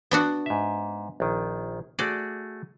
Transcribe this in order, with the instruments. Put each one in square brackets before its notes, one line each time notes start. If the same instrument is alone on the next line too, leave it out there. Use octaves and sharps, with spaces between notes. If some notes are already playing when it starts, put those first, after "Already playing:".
[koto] B3 D4 F#4
[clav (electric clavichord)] G#2 E5
A#1 D#3
[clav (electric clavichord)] A3 F#4 G#4 [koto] D5